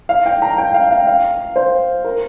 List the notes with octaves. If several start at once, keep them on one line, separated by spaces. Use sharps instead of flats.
F5
G5
A#5
G5
F5
F5
F5
C5
A#4